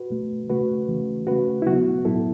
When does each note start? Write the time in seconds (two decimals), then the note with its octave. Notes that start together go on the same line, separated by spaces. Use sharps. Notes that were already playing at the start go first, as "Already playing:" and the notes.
Already playing: F#4 B4
0.10 B2 A3
0.49 C#3 A3 F#4 B4
0.89 C#3 E3 A3
1.27 C#3 A3 F#4 B4
1.62 E4
1.66 B2 F#3 B3 F#4
2.05 A2 F#3 B3 E4 A4